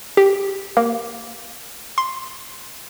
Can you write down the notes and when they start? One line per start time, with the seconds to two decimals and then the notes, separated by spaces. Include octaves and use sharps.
0.17 G4
0.77 A#3
1.98 C6